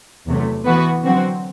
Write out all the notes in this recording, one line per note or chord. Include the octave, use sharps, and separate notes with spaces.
E2 C3 F#3 A3
E3 B3 F#4 B4
D3 F#3 C4 F#4